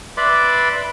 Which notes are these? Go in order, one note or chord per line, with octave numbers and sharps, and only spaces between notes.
B4 D5 E5 B5 C6 D6